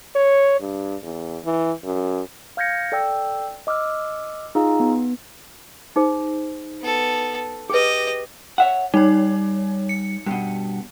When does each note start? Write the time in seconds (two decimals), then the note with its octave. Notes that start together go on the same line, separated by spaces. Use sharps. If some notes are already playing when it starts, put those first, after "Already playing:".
0.15 C#5
0.61 G2
1.03 E2
1.45 E3
1.84 F#2
2.57 F5 F6 G6 G#6 A#6 C#7
2.92 A4 D5 G5 E6
3.67 D#5 D6 E6 F6
4.55 D#4 F4 G#4 F5 A#5
4.80 B3
5.96 D#4 G#4 C5
6.81 B3 A4
7.70 G4 G#4 B4 D#5
8.58 C#5 E5 F#5
8.94 G3 D#4 C#5
9.89 C#7
10.26 G2 B2